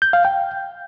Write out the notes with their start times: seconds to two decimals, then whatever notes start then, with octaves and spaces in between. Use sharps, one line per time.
0.02 G6
0.13 F5
0.25 G5